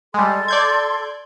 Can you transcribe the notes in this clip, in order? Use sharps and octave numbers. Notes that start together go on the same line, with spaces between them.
G3 G#3 A4 C6
D5 G6 G#6